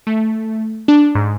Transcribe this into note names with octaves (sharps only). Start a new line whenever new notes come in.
A3
D4
G#2